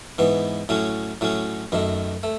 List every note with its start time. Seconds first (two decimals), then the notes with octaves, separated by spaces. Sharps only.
0.18 G#2 E3 B3
0.69 A2 F#3 C#4
1.21 A2 F#3 C#4
1.72 F#2 D#3 A3
2.23 A3